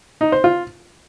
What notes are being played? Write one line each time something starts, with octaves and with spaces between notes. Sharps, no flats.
D#4
C5
F4